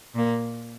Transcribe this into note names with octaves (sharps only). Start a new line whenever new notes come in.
A#2 A#3